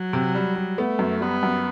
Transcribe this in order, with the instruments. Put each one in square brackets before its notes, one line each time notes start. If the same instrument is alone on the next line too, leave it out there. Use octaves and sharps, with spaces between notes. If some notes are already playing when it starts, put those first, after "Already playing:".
Already playing: [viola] F#3
[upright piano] C3
G3
G3
[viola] A3 [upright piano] B3
[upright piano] F#2
[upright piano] G3 [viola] B3
[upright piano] F#2